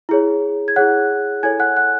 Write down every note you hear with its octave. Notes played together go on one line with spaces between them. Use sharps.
E4 G#4 C#5
G#6
E4 G#4 C#5 F#5 F#6
E4 A4 C#5 G#5 G#6
F#5 F#6
F#5 F#6